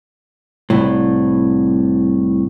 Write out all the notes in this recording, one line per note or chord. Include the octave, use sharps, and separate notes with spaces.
C2 A2